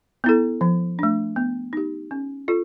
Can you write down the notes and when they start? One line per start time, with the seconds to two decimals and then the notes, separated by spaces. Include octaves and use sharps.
0.24 B3 E4 A4
0.61 F3
0.99 A3 D4
1.36 B3
1.73 D#4 G4
2.11 C#4
2.48 F4 A4